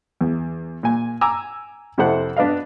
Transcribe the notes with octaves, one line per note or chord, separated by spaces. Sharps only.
E2
A#2 G#5
G#5 A#5 D6 E6
F2 C3 E4 A4 C5 F#5
B3 D4 B4 D#5 F5